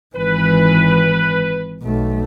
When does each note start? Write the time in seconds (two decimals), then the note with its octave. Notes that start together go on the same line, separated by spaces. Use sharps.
0.16 G#1 E3 B4
1.83 B1 A3